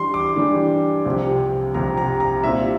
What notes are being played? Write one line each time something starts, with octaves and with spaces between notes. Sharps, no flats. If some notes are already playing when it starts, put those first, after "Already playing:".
Already playing: E3 G3 D4 G4 C6
D6
E3 G3 D4 G4
C2 C3 F3 C4 G4
C2 C3 F3 C4 G4 A#5
A#5
A#5
A#2 G3 C4 E4 E5